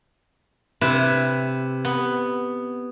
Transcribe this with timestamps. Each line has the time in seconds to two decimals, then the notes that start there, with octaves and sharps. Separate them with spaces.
0.81 C3 E4 B4
1.85 B3